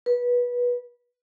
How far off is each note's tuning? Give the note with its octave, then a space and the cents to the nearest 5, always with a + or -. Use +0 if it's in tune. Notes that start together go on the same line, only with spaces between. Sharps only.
B4 -20